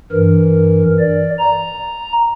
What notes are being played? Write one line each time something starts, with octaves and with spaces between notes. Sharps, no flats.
G2 E3 A#4
D5
A#5